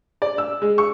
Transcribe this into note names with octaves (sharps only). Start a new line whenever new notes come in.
D5
E6
G#3
C#6